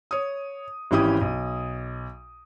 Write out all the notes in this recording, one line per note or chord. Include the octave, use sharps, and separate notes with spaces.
C#5 D#6
G#1 E3 C#4 E4 G4 D#6
B1